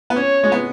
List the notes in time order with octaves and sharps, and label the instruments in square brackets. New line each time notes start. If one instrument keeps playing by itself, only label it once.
[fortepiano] B3
[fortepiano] C#4 [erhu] C#5
[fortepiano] G#3
B3